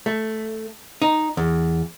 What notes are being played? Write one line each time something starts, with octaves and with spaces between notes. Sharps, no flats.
A3
D#4
E2